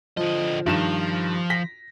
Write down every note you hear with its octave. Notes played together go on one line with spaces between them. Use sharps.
D3 F3 D#5
G2 D#3 F3 E7
A#6 B6